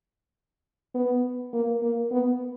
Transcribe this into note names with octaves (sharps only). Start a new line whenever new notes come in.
B3
A#3
A#3
B3